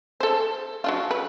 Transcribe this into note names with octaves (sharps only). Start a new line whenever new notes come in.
A4 C5
F#3 D4 F4
B4